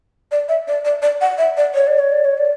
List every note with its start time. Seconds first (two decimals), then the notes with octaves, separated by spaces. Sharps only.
0.31 D5
0.49 E5
0.68 D5
0.85 D5
1.02 D5
1.21 F#5
1.38 E5
1.57 D5
1.75 C#5
1.87 D5
1.99 C#5
2.12 D5
2.25 C#5
2.38 D5